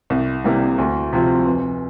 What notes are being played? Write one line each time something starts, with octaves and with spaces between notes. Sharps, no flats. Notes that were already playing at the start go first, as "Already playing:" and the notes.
C2
C3 G3 A#3 E4
D2
C3 F3 C4
F1